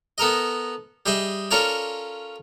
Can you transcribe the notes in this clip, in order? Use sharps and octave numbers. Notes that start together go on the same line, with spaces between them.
B3 A4 A#4 D#5
G3 G#4 D#5 E5
C#4 F4 A4 A#4 C#5 D5